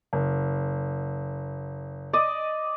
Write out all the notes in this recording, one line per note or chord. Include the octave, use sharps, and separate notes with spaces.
F#1
D5 D#5